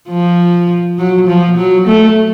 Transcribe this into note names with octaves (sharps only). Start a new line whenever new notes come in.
F3
F#3
F3
F#3
A3